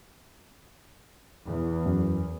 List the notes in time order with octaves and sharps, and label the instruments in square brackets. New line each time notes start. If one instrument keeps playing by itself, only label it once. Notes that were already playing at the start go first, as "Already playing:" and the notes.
[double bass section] E2
[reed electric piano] F#2